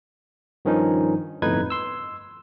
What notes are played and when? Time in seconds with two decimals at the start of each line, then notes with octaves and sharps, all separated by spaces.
0.65 G2 D#3 F3 C#4 D#4
1.42 G1 F2 A2 D#4 B4 G#6
1.70 C6 E6